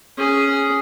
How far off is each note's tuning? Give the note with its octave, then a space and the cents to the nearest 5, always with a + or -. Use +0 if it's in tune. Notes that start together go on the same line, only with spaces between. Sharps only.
C#4 +0 G#4 +0